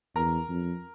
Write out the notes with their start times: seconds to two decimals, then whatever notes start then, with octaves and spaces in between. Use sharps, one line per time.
0.15 E2 A#4 A#5
0.49 F2